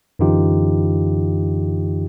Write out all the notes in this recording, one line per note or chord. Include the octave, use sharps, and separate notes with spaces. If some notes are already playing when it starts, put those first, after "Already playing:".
F#2 D3 E3 D#4 F4 G4